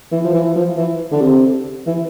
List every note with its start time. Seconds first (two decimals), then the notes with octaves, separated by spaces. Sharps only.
0.12 E3
0.24 F3
0.34 E3
0.56 F3
0.77 E3
1.12 D3
1.21 C3
1.86 E3